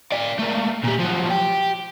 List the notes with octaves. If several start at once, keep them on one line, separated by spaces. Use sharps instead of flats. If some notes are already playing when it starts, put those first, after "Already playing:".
D5 F5
A3 A#3
A#2 G3
F3 F#3
G4